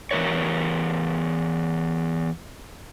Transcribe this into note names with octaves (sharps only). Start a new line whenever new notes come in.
E2 E3 A#4 C#5